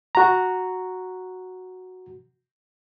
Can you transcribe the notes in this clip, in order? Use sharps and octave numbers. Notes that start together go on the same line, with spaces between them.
F#4 A#5